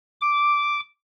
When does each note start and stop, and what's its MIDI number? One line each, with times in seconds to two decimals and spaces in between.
0.21 0.80 86